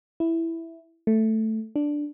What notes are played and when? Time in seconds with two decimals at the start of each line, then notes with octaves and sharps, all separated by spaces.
0.20 E4
1.07 A3
1.76 D4